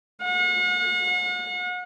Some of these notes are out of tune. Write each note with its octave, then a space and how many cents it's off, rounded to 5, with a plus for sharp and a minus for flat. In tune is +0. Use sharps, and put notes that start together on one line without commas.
F#5 -40